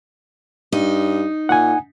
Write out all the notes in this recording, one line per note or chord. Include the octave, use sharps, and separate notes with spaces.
G2 D#4
A#2 F#5 G#5